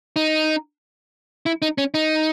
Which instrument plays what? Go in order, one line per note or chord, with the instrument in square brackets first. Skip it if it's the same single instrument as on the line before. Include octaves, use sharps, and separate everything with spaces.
[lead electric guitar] D#4
E4
D#4
C#4
D#4